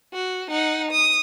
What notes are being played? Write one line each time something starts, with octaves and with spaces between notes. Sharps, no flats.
F#4
D#4 F#5
D#6